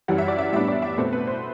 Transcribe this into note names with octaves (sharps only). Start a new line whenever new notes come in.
F#2 E3 G3 F#5
E5
D5
E5
A2 G3 B3 D4 E5
D5
E5
B2 A3 C4 B4
B4
C5